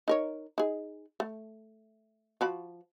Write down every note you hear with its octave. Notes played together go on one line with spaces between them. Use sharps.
D#4 A#4 C#5
D#4 G#4
A3
F3 F#4 B5